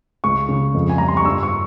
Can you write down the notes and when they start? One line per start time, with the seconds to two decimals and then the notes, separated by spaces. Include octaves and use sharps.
0.24 C#2 C#6
0.49 C#3
0.74 F2
0.89 G#5
0.98 G3 A#5
1.08 C6
1.17 C#6
1.25 G2 E6
1.43 C#6